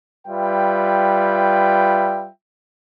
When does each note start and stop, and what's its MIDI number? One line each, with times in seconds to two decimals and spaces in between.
0.28 2.30 55
0.28 2.30 65
0.28 2.30 71
0.28 2.30 76
0.28 2.30 79